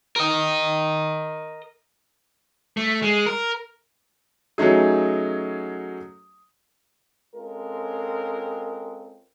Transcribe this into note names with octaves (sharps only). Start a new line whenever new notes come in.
A#4 D#5
A3
G#3
A#4
F#3 A3 C#4 D#4 G#4
G#3 C4 C#4 F4 A4 A#4